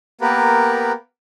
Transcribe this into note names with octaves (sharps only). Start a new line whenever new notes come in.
A#3 B3 G4 A#4 B4